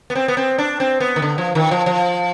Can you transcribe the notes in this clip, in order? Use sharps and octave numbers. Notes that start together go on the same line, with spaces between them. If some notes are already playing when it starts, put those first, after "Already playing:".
B3
C4
B3
C4
D4
C4
B3
D#3
D3
F3
D#3
F3
F3